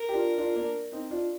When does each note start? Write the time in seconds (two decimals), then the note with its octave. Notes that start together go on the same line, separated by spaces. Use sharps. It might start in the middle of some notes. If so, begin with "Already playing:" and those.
Already playing: A#4
0.09 G4
0.14 D4 F4
0.38 D4 F4
0.56 A#3 D4
0.92 C4 D#4
1.11 D4 F4